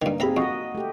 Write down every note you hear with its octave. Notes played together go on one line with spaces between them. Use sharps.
G2 D#3 A#3 D#4
C4 G#4 E5 A#5 B5
F2 F#4 D#5 C#6
A3 G4